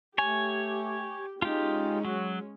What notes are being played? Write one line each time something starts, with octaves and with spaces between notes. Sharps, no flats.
A3 G4 C#5 G#5
G#3 C#4 D#4 F4 G4
F#3 F#4